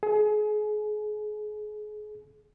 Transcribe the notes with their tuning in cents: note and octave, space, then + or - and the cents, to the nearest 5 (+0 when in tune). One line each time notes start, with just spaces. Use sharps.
G#4 +30